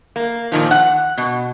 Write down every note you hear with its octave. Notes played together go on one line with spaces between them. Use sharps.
A#3
A#2 D#3 F3
F#5
B2